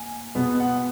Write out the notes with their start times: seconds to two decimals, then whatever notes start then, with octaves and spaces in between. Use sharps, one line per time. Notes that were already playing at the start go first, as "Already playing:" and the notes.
Already playing: A#3 G#5
0.35 B2 G#3 B3
0.60 F#5